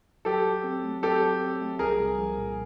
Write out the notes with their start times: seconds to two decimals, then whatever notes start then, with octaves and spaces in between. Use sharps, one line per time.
0.25 F#3 G4 A4
0.45 F#3
0.64 C4
0.84 A3
1.02 F#3 G4 A4
1.22 F#3
1.41 C4
1.61 A3
1.79 C2 G#4 A#4
1.99 C2
2.18 F3
2.38 A#2